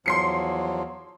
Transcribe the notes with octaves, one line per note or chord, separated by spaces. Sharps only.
E2 F3 F#3 C6 C7 C#7